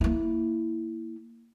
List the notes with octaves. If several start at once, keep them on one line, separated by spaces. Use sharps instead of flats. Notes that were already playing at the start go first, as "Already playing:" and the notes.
A#3 E4